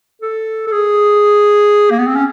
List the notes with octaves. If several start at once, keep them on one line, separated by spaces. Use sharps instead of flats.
A4
A4
G#4
A#3
B3
C4
C#4